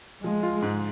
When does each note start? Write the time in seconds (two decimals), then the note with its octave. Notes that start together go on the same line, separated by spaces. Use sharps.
0.24 F3 G#3
0.43 F4
0.62 G#2